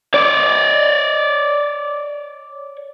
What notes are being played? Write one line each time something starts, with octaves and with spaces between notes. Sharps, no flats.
C#5 D5